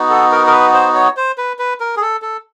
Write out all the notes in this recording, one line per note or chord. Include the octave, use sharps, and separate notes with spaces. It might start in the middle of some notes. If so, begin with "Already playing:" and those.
Already playing: B3 D#4 F#4
A4
A#4
A#4
B4
C5
C#5
C5
B4
B4
A#4
G#4
A4
A4